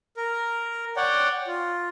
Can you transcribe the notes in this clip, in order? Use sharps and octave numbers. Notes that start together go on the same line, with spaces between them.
A#4
C#5 D5 F#5 G5
F4